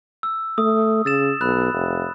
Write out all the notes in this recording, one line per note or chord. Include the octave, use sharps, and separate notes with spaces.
E6
A3 D#6
C#3 E6 A6 E7
B1 B5 F#6
F1